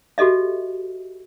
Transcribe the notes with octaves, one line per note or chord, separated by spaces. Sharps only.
F#4 G4 A4 D#5 E5